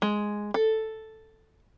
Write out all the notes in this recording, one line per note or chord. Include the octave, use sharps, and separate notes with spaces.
G#3
A4